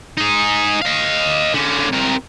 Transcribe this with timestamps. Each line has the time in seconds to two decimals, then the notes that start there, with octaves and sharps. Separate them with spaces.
0.17 D#4 G#4
0.82 D#5 F5
1.54 D3 C#4
1.92 C3 A#4